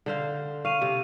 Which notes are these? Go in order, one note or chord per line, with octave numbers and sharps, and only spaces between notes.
D3 C5 F5
F5 C#6 D#7 F7
C3